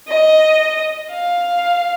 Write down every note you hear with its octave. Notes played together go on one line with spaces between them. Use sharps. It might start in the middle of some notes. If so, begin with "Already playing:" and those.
D#5
F5